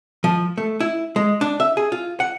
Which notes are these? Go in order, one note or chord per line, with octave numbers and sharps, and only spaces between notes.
F3
A3
E4
G#3
D4
E5
G#4
F4
F#5